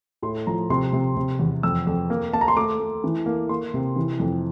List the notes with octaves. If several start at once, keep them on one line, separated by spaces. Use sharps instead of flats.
A2 C6
F3 A#5
C3 C6
C3
C3
E2
F2 E6
F2
A#3
A#3 A5
A#5
C6
A3 D6
A3
E3
A#3
A#3 C6
C3
E3
F2